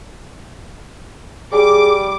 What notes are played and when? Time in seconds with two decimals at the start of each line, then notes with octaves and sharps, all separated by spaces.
1.52 G3 G#4 D6